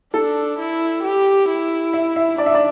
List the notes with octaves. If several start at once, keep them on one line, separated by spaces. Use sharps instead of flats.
D4 A4
E4
G4
E4
E5
E5
D4 D5
E5
D5